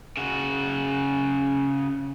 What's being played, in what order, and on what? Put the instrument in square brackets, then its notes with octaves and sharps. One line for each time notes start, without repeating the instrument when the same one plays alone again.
[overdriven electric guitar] C#3 F#4